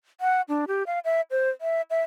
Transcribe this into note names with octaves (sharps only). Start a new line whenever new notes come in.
F#5
D4
G4
F5
E5
C5
E5
E5